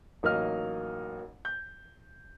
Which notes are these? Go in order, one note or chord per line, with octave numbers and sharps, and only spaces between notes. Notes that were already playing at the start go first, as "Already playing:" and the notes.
A1 F#3 A#3 D#4 D#5 F6
G6